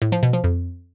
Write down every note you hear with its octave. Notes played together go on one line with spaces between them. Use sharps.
A2
F3
B2
F3
F2